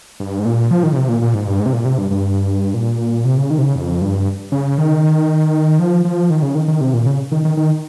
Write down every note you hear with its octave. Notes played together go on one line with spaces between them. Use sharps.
G2
G#2
A#2
F3
D#3
C#3
C3
A#2
A#2
G#2
G2
G#2
C3
A#2
C3
G2
G2
A#2
C3
C#3
D#3
C3
C#3
F2
G2
C#3
D#3
F3
F3
D#3
C#3
D#3
D#3
C3
A#2
C#3
D#3
D#3
D#3